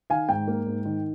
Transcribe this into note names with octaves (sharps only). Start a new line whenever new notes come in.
D#3 F5 G#5
G#2 G5
A#3
G#2
D#3